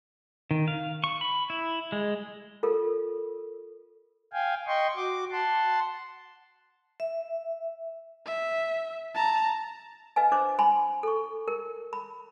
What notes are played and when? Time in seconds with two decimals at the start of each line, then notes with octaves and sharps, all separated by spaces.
0.51 D#3
0.68 F5
1.04 C#6
1.21 B5
1.50 E4
1.92 G#3
2.63 F4 A4 A#4
4.33 F5 G5 G#5
4.67 D#5 G5 C6 C#6
4.96 F#4 D6
5.31 F#5 A5 C6
7.00 E5
8.26 E5
9.15 A5 A#5
10.16 B4 D#5 F5 G#5
10.32 D4 C5 D6
10.59 G#5 B5 C6
11.03 A4 C#6
11.48 A#4
11.93 B5